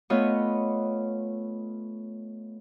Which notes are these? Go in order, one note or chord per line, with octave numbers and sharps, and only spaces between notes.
A3 B3 F4 C#5 D#5